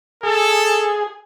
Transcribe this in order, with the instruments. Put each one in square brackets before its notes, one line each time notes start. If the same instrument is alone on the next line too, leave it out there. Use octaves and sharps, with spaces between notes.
[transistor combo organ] G#4 [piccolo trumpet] A4